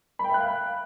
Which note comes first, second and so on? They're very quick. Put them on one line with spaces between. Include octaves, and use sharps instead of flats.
B5 G5 E5 F#6 F5